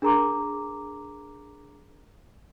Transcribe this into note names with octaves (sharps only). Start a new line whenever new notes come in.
D4 G#4 A#4 A#5 C6 D6